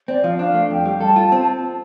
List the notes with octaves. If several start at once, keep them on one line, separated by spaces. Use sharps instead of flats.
C4 D5
F3 F5
D4 F5
A3
F2 G5
G3
A4 A5
F4
C4